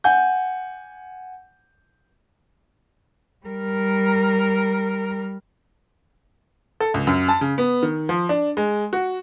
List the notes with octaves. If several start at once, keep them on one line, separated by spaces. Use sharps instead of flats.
F#5 G#5 G6
G3 A#4
A4
C#2
F#2
A5
C#3
B3
D#3
F3
D4
G#3
F#4